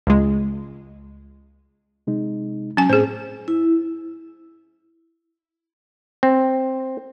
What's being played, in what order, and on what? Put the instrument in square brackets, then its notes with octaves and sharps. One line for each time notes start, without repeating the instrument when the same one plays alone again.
[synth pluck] C#2 G#3
[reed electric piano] C3 G#3 D#4
[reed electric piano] F#3 [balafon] C#4 G#5
[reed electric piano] A2 C4 [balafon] G#4 C5
[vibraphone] E4
[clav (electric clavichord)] C4